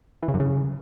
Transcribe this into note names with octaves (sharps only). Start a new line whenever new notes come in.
E3
C#3
F#2
C#3